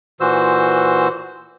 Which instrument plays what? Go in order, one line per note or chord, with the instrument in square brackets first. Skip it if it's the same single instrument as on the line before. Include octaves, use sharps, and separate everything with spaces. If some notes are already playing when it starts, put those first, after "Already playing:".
[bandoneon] A#2 E3 F#4 C5 E6